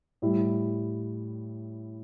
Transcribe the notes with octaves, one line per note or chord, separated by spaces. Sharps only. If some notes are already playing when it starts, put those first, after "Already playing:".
A2 G3 E4